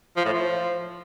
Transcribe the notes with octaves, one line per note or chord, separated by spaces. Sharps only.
F3
A2
F3